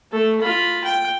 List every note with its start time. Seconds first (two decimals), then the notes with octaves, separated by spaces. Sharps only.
0.12 A3 A4
0.41 F4 B5
0.84 G5